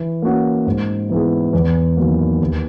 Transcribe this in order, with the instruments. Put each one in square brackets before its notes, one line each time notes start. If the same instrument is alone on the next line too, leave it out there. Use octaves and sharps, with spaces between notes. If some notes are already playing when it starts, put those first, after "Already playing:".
Already playing: [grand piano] E3
A#3 C#4 F#4
G#2
E3 B3 E4 G#4
E2
D#3 F#3 A#3
D#2